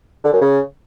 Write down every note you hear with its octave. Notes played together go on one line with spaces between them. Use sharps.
D3
F#2
C#3